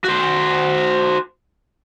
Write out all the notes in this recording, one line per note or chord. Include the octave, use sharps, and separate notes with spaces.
F#4 C5